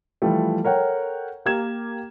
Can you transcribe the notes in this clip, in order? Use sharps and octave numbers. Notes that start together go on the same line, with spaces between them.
E3 F3 G3 A3
A4 A#4 C#5 F#5 G5
A#3 G4 A#4 G#6 E7